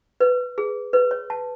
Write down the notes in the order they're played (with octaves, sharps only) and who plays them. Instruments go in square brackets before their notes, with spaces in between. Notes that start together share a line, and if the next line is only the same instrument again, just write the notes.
[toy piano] B4
G#4
B4
C#5
A5